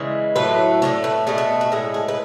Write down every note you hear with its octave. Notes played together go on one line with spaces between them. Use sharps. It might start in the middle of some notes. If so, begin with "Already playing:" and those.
Already playing: C#3 E3 G#3
A2 F#3 A3 B4
A2 F#3 A3 C#5
B4
B2 A3 G#4
F#4
F#4
A2 G#3 G#4
G#4
B4